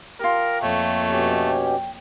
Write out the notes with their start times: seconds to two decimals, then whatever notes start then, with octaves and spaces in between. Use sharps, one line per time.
0.20 F4 G4 A#4
0.62 F2 A3 A#3 C#5
1.10 B2 C#4 G4
1.46 G5